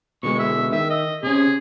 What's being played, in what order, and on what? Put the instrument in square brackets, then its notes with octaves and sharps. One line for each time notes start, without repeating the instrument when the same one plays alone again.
[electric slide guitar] B2 D3 G#3 [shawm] C#6
[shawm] E5
[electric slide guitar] D#3 [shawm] E5
[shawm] D#5
[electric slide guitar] C3 C#4 [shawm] G#4